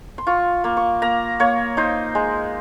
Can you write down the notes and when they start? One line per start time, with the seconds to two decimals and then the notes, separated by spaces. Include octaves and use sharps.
0.18 C6
0.27 F4 C#6
0.64 A#3
0.77 C#6
1.02 A#3 A#5
1.40 A#3 C#5
1.77 D#4 C5
2.15 G#3